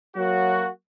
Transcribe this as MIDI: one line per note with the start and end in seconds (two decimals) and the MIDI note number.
0.16 0.69 54
0.16 0.69 58
0.16 0.69 66